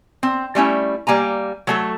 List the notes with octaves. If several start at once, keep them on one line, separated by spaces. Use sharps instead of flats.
C4
G3 A3 C#4 E4
G3 A#3 G#5 A#5
F#3 A3 A4